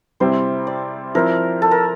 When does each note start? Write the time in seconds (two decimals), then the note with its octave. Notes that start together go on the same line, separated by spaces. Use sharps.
0.20 C3 G3 C4 E4 C5
0.67 D5
1.15 F3 C4 E4 A#4
1.62 A4
1.71 A#4